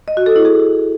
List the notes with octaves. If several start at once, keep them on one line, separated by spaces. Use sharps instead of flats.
D#5
F#4
A4
E4
G#4